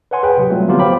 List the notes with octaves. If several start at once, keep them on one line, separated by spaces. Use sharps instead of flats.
B4 C#5 F#5 G#5 C6
G#4 B4 G5
C3 F#3 G4
F#3 G3 A3 C4 F4
D3 F3 F#3 B3 F4 G4
C5 F5 G5 B5 D6